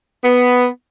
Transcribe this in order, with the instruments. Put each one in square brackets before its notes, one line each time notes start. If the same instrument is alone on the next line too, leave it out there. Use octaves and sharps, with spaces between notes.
[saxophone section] B3